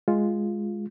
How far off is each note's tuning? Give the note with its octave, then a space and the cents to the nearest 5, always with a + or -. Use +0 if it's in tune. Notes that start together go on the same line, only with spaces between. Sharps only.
G#3 +0 F4 +0